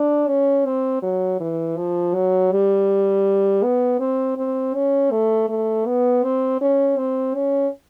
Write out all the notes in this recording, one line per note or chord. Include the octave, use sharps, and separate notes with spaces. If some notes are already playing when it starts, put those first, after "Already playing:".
Already playing: D4
C#4
C4
F#3
E3
F3
F#3
G3
B3
C4
C4
C#4
A3
A3
B3
C4
C#4
C4
C#4